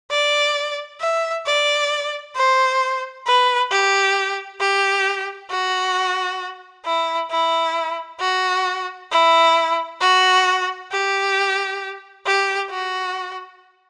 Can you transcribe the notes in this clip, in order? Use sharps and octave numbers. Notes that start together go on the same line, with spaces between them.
D5
E5
D5
C5
B4
G4
G4
F#4
E4
E4
F#4
E4
F#4
G4
G4
F#4